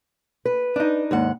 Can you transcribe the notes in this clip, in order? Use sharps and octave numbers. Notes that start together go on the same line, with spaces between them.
B4
D4 D#4
D#2 G#2 F#5